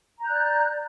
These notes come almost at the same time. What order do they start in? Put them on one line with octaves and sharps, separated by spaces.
A#5 G6 F#6 D5